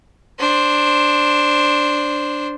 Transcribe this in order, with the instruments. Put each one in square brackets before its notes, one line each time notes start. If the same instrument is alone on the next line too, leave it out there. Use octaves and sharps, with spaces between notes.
[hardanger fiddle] D4 C5